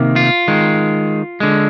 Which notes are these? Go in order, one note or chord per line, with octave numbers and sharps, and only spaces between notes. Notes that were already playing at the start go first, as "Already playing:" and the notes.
Already playing: C3 D#3 A#3
F4
D#3 G#3
D3 G#3